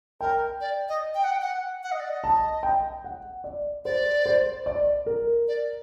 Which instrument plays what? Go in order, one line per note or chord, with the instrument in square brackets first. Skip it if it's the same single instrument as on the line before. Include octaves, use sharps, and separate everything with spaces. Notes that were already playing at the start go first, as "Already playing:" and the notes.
[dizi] A#4 [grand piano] G5
[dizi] D5
D#5
G5
F#5
G5
F#5
F#5
D#5
D5
D#5
[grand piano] A5
G5
F#5
D5
[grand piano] C5 [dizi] D5
[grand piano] C5
D5
A#4
[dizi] D5